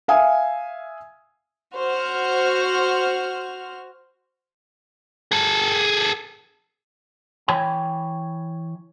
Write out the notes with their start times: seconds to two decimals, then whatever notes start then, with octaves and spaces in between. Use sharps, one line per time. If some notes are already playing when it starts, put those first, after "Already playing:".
0.08 E5 F5 G#5 D#6
1.75 F#4 C5 F6
5.32 G#4 A4
7.48 E3 C#5 G5 G#5 B5